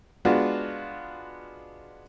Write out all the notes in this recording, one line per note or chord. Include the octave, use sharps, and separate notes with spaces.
G#3 B3 D4 F4 F#4